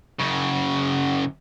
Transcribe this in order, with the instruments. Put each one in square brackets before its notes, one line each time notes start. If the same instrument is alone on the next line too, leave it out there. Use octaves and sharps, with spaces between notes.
[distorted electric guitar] F#2 C#3